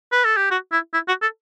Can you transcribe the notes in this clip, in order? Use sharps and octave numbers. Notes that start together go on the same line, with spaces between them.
B4
A4
G4
F#4
E4
E4
F#4
A4